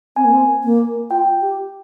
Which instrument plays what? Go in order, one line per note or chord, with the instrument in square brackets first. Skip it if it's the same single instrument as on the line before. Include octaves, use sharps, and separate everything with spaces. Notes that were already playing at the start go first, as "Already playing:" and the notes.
[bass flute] C4 [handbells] G#5
[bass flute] A#3
C4
A#3
[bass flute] F4 [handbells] G5
[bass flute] G4